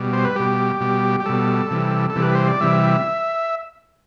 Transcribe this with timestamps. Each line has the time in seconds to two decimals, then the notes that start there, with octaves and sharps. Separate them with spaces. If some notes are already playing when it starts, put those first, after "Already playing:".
Already playing: B2 G3
0.13 C5
0.25 B4
0.36 B2 G3 G4
0.81 B2 G3
1.20 G4
1.26 B2 G3 A4
1.71 C3 E3 G3
2.10 A4
2.16 C3 E3 G3
2.22 B4
2.35 C5
2.48 D5
2.61 C3 E3 G3 E5